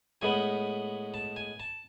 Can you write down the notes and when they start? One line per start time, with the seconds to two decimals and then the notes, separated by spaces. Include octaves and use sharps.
0.22 A2 G#3 B3 G#5
1.14 A5
1.36 G#5
1.60 A5